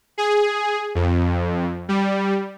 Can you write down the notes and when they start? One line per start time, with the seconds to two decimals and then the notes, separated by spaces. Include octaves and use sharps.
0.18 G#4
0.95 F2
1.89 G3